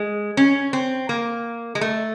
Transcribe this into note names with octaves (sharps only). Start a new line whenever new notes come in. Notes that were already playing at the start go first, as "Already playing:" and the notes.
Already playing: G#3
C#4
C4
A#3
G#3
A3